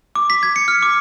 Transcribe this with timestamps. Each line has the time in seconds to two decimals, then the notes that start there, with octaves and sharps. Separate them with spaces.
0.15 D6
0.30 B6
0.43 G#6
0.56 C#7
0.68 F6
0.83 D6